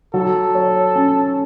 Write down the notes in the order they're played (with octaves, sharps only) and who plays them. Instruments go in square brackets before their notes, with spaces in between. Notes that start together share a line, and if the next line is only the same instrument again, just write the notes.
[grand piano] F#3 [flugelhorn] A4
[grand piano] C#5
C#4